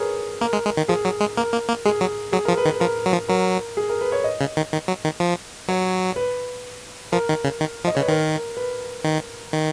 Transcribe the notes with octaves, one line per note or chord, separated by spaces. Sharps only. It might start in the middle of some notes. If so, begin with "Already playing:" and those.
Already playing: G#4 A#4 B4 C#5
A#3 A#4
G#3
G#3
D#3
F3 G#4
F#3
G#3
A#3 A#4
A#3
A#3
G#3 G#4
F#3
F#3 G#4
F3 A#4
B4
D#3
B4
F3 A#4
F#3
F3
F#3 A#4
G#4
A#4
B4
C#5
D#5
C#3
D#3
D#3
F#3
D#3
F3
F#3 C#5
B4
F3 A#4
D#3
C#3
D#3
F3
D#5
C#3 C#5
B4
D#3 A#4
B4
D#3
D#3